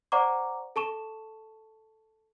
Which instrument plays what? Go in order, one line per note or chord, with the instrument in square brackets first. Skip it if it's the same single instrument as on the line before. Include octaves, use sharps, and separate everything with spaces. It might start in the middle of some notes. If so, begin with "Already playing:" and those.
[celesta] C5 D5 F#5 A#5 C#6 D6
A4 A5 C#6 E7